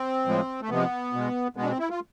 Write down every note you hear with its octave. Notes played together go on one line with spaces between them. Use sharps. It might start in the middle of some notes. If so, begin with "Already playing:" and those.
Already playing: C4
A2 F3 G#3
A3
C3 F3 G#3 B3
B2 G#3
B2 G#3 B3
D4
C4
E4
F4